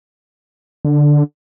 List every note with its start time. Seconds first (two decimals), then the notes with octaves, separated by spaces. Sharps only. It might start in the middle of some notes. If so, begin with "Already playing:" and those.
0.85 D3